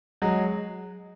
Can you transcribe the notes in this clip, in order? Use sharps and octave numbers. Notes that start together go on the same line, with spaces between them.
F#3 G#3